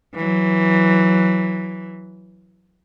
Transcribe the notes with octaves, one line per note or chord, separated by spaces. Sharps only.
E3 F#3